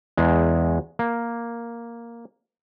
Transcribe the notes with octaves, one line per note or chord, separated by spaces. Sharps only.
E2 G#3
A#3